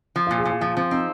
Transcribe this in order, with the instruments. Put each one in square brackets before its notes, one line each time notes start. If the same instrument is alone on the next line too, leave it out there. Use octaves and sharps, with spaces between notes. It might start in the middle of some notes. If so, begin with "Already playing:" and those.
[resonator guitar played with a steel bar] F3
[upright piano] F4
[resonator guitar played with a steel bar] A#2
[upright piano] G#4
[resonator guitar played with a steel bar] A#2 [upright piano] F4
[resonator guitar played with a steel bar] F3 [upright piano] F4
[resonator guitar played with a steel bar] F3 [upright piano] C4
[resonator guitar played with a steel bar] C4 [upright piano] D#4